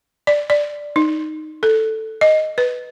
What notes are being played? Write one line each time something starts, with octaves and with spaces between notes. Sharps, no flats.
D5
D5
D#4
A4
D#5
B4